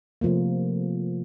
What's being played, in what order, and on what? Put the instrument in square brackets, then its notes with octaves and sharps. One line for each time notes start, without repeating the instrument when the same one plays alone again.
[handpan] C3 F3 A3 A#3